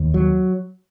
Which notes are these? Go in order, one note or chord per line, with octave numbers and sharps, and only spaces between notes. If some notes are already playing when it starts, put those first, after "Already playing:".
Already playing: D#2
F#3